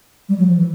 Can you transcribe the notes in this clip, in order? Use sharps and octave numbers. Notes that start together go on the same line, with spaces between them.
G3
F#3
F3
E3